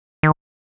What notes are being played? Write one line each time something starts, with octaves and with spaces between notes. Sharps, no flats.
D#3